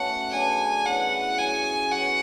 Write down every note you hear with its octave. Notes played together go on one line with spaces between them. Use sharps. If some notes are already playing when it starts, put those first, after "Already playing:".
Already playing: B2 A3 C#4 F#4 F#5
C#3 F#3 B3 D4 G#5
C#3 E3 B3 F#4 F#5
F#3 C#4 G#4 G#5
F#3 B3 F#4 F#5